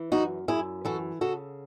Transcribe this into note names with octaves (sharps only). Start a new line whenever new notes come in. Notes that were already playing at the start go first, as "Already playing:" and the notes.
Already playing: E3
F#2 D#4 F#4
F#2 E4 G#4
E3 F#4 A4
C#3 F#4 A4